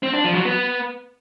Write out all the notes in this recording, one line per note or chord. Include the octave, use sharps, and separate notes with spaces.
C4
D4
F3
F#3
B3